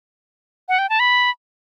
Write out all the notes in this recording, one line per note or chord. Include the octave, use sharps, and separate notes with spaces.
F#5
G5
A5
B5